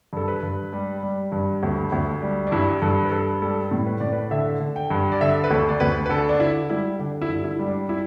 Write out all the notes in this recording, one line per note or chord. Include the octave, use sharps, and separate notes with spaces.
G2 A4
B4
G2
G3
G3
G2
D2
D2
G3
D4
G2 E4
G2 A4
B4
G2 A4
G3 A4
A2
B4
A2 D5
B4
D3 E5
D3
G5
G2
D5
D3 E5
B4
D2 A4
D5
D2 B4
B4
D3 A4
D4
D3 E4
G3 E4
D3 D4
E4
G2
E4
G3
D4
E4